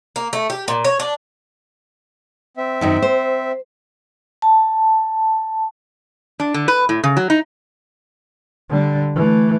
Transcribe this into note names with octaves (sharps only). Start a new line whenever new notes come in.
A#3
A3
G4
A#2
C#5
D4
C4 E5
F#2 D#3 F#3
C5
A5
D4
D3
B4
A2
C#3
F#3
D#4
D3 G3
E3 A3